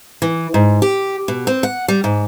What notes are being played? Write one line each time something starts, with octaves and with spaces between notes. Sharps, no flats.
E3
G#2
G4
B2
C4
F#5
G3
G#2